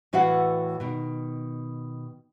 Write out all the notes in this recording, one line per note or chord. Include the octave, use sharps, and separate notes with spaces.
A2 E3 F#4 B4 F5 F#5
B2 D#3